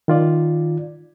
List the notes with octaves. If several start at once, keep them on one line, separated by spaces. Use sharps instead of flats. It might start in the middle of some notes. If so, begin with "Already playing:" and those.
D#3 F4 D5